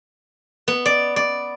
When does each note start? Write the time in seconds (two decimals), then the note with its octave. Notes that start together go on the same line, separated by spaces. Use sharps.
0.68 B3
0.86 D5
1.16 D5